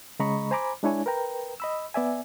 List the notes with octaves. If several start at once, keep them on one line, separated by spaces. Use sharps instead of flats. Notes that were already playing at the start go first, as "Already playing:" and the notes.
C#3 G#3 D#5 A#5 B5 C#6
C5 G#5 A#5 B5 D6
G#3 D4 E4 C#5 G#5
A#4 B4 G5 A#5
D#5 B5 E6
B3 D5 E5 G#5